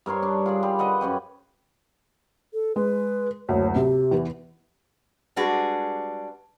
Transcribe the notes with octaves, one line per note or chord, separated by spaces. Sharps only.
G2 A#4 C#5 C6
D4
F4 G#4 D5
G3
B4 D5 D#5 F#5
F#2 C#4 D5 G5
A4
G#3 B4
F#1 D2 C#5
C3 G4
E2 E3
G3 G#3 D4 F#4 G#4 B4